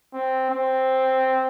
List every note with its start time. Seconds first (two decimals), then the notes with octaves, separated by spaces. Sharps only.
0.13 C4
0.51 C4